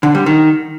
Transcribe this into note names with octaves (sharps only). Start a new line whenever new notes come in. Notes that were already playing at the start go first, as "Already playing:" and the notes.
D3
G3
D#3